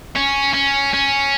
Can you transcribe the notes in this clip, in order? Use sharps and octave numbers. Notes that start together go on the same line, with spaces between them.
C#4
C#4
C#4